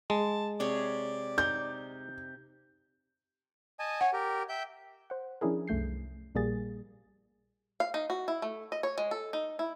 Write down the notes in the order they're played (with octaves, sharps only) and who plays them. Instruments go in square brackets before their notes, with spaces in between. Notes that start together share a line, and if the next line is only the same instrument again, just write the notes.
[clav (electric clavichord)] G#3 [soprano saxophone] A5
[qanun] C3 G#4 C#5 [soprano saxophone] D5
[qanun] D#4 [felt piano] G6
[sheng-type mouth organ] D#5 G#5 A5
[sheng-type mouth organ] C#5 G#5 [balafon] F#5
[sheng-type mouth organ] G4 A#4
E5 G5 G6
[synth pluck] C5 F#5
F3 C#4 D4 E4 G#4 A#4
C2 F#2 A3 G6 C7
A#1 A#2 G3 A#3 G#4 A6
[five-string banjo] F5
D#4
F#4
E4
A3
D#5
C#5
G#3
A4
D#4
E4